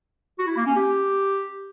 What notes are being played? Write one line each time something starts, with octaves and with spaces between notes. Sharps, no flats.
F#4
E4
A#3
C#4
G4